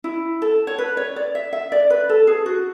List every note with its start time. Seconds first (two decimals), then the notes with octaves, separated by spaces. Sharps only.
0.04 E4
0.42 A4
0.67 C#5
0.79 B4
0.97 C#5
1.16 D5
1.35 E5
1.53 E5
1.72 D5
1.90 B4
2.09 A4
2.27 G#4
2.46 F#4